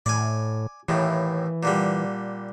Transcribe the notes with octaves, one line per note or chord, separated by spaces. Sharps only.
A2 D5 G#5
D#2 A2 E3
A#2 D3 G3